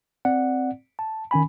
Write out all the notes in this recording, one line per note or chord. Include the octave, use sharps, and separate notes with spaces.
C4 D5 F#5
A5
D#3 C#4 G#5 B5